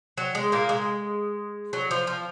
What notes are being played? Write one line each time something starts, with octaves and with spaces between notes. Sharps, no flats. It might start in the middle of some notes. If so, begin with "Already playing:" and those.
F#3
G#3
A#2 A#3
G#3
F#3
F3
F3